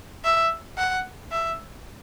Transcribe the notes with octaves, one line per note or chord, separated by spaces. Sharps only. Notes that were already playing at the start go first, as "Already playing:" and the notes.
E5
F#5
E5